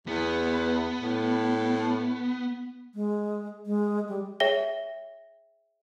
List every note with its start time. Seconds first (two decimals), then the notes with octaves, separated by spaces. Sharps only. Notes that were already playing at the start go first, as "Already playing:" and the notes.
0.07 E2 B3
1.01 A2
2.95 G#3
3.66 G#3
4.09 G3
4.40 G#4 C#5 E5 G5 A#6 G7